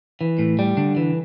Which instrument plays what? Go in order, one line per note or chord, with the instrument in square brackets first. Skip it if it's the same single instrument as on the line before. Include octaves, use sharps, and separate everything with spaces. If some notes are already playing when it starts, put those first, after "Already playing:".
[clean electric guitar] E3
A2
G3
D3
E3